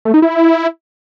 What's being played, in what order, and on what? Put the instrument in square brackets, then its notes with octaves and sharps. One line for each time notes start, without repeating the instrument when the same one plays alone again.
[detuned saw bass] A3
D#4
E4